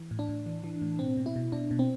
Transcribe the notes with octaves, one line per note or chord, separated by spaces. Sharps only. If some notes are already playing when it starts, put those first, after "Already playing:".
Already playing: E3
A2
D4
A2
E3
E3
A2
B2 C4
B2
E4
B2
B2 D4
B2
C4